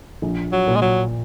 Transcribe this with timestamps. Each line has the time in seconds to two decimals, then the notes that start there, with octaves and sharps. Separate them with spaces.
0.22 A#1
0.52 F#3
0.67 A#2
0.76 G#3
0.82 F#3